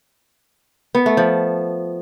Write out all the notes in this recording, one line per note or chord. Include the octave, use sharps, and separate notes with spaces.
B3
A3
F3